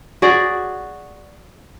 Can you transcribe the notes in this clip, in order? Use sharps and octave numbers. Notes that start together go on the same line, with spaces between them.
F#4 G#4 D5